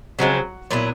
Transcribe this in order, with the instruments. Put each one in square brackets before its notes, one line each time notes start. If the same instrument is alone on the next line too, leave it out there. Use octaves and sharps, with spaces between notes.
[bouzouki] C#3 F3 G#3 C4 [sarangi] F#3
[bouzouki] A#2 F#3 B3 E4